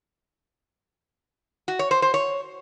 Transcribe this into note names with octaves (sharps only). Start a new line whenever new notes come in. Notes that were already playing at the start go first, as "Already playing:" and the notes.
F#4
C#5
C5
C5
C#5